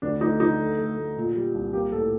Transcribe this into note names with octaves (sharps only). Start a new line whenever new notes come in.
D2 D4
A3 D#4
D3 D#4
A3
A3
A3
A#2
G3
C2
A#3 G4
A2 A4